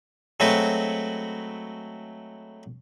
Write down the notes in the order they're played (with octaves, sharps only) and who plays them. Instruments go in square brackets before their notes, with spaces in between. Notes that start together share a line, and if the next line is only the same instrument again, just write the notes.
[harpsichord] F#3 G#3 A3 C4 F#4 B4